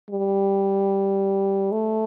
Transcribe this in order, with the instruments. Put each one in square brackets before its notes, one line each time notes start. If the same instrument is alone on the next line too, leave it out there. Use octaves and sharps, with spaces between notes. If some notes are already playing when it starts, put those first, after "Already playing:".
[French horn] G3
A3